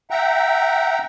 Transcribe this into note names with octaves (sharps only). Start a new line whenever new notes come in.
E5 F#5 G5 A#5